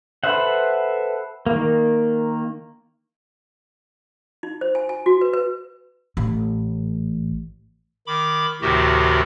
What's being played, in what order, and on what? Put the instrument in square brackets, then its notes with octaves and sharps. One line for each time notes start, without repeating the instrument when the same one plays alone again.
[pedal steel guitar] A4 B4 C5 E5 F#5
D#3 A#3
[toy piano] D#4
C5
G#5
G#5
F#4
B4
B4
[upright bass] A1 A2
[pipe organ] D#3 B5 D6
D2 A2 C3 D#3 F#4 G4